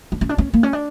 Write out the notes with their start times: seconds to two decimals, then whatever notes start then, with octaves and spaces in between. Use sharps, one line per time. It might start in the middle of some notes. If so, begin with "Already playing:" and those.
0.12 D4
0.21 C#4
0.29 D4
0.38 C#4
0.53 A#3
0.63 C#4
0.73 D4